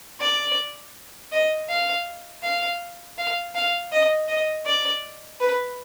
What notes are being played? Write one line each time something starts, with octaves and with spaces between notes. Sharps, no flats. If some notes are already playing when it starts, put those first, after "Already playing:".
D5
D#5
F5
F5
F5
F5
D#5
D#5
D5
B4